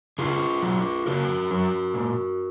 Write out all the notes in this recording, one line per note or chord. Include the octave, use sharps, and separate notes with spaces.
C#3 F4 G#4
F#3
C#3 F#4 A#4
F#3
A#2